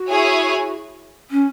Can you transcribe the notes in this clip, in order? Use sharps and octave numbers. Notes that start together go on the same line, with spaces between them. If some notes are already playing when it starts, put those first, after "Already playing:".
Already playing: F#4
E4 G#4 C#5 G#5
C#4